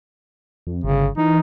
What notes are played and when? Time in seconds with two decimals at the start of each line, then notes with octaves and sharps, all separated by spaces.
0.67 F2
0.84 G1 C#3
1.18 E3 D#4